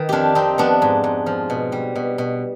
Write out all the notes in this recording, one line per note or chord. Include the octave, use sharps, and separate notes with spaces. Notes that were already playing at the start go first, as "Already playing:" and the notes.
Already playing: D#3 B4
F2 D4 F4 G4
F2 C4 D#4
F3 B3 D4
G#2
G#2
F3
B2
G3
B2
B2